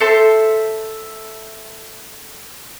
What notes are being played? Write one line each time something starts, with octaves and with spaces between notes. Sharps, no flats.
A4 C5 E5 A5